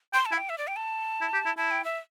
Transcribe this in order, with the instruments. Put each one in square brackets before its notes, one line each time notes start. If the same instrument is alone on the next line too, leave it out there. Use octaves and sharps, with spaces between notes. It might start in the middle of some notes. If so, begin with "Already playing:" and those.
[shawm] G5 [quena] C6
[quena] A5
[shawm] E4 [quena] E5
[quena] G5
E5
D5
G5
A5
[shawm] E4
G4
E4
[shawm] E4 [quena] A5
[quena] G5
E5